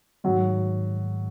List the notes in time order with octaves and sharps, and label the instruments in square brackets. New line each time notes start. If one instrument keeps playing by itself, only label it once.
[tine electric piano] G#2 D#3 G#3 [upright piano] F#3